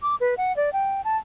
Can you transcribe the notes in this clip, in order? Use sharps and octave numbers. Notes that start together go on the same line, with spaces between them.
D6
B4
F#5
D5
G5
A5